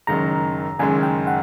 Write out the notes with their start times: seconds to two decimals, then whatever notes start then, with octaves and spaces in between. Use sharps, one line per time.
0.07 F#1 F#2 D#3 G#3 A#5
0.79 F#1 F#2 D#3 G#3 G#5
1.03 G5
1.27 F#5